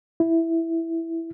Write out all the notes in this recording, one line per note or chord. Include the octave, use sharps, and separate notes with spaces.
E4